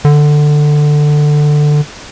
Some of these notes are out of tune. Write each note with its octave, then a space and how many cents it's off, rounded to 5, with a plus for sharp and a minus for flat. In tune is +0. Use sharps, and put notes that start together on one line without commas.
D3 +15